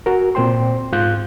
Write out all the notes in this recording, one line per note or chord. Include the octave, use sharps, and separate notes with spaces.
F#4 A#4
A#2 C4 C5 G5 C6
G#2 F4 F5 F#6 G6